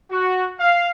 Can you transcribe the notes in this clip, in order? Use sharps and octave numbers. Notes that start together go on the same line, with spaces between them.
F#4
F5